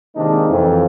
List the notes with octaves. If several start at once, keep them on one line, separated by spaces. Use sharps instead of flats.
C3 D#3 G#3 A#3 D4 D#4
F2 E3